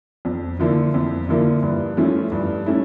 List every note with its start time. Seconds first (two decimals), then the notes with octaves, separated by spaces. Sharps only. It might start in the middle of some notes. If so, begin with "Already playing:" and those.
0.25 F2
0.59 D3 F3 A#3 E4
0.94 F2
1.29 D3 F3 A#3 E4
1.62 G2
1.97 F3 A3 C#4 E4
2.32 G2
2.66 A3 C#4 E4